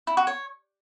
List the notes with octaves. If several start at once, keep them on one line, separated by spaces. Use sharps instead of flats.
E4
F#4
C#5